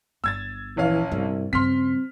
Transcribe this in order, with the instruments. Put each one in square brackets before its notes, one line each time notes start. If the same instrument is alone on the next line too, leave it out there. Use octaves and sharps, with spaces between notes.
[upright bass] G1 [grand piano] E6 G#6 A6
[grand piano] A#1 C#4 F5 [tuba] E3
[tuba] C2 [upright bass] G2
[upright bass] G2 C#3 [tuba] C4 [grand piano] C6 F6 B6